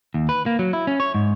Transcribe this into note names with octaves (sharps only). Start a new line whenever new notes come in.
D#2
B4
A#3
F#3
E4
C#4
C#5
G#2